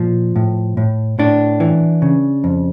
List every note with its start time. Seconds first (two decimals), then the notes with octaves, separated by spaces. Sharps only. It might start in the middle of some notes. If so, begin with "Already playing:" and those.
Already playing: A#2 F3
0.36 A2
0.77 A2
1.19 A2 D4
1.60 E3
2.02 C#3
2.44 F2